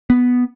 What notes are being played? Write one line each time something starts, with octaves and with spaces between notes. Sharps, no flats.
B3